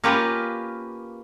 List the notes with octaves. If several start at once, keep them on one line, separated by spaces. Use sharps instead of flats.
A#3 C#4 F4 G4 A#4 B4